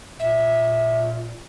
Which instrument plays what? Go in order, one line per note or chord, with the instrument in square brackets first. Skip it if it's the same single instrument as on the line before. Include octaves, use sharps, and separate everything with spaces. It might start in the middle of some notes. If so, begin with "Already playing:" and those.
[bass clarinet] A#2 [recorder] E5